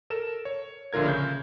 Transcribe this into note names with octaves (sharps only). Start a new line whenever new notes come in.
A4 A#4 E7
C#5
A#1 D3 F4 A#4 G#6
C#3 G6